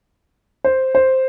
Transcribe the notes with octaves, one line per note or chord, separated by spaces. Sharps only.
C5
C5